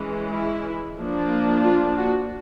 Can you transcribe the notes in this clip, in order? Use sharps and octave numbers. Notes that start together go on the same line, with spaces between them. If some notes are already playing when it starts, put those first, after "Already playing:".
Already playing: E3 G#3 C#4
E4
F3 A#3 D4
F4
F#4